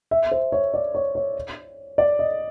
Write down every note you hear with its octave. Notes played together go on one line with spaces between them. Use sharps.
E5
C5
C#5
D5
C#5
C#5
D5
D#5